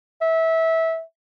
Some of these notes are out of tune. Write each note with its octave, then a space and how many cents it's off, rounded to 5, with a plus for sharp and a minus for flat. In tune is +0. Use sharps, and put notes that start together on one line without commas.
E5 -20